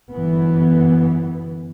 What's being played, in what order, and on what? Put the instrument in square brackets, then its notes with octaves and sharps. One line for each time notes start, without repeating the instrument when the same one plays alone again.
[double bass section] G1 F#2 E3 B3